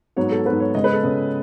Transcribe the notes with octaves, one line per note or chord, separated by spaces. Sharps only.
G#2 F#3 B3 C#5
A4
G#2 F#3 B3 B4
C#5
C#3 G#3 B3 D#5
B4
A4
C#3 G#3 B3